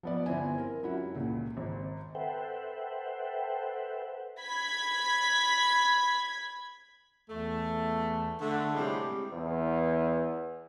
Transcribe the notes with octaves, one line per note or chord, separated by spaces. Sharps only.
F3 B3 D5
G1 C4 E4 G#5
A#4
F#2 E4 F#4
C#2 A#2
G#1
A4 B4 C5 E5 F#5 G5
B5 G#6 B6
E2 A3
D3 A3
A2 C3 G3 G#3
E2